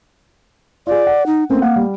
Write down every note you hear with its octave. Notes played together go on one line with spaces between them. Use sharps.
F4 G#4 D5
F#5
D#4
A3 A#3 C4 C#4
A#3 F5 F#5
G3